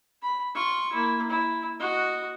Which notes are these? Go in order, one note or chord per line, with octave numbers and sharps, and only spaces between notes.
B5
F4 C#6
A#3 E4
E4
F#4 D#5